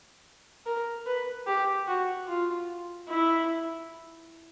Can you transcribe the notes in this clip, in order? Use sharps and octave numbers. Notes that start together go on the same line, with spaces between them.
A#4
B4
G4
F#4
F4
E4